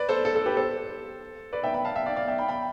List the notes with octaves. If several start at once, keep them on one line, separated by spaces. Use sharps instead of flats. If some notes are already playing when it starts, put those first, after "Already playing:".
Already playing: B4 D5
A4 C5
A4
A4
G4 B4
A4 C5
B4 D5
E5 G5
G5 B5
F5 A5
E5 G5
D5 F5
D5 F5
E5 G5
G5 B5
G5 B5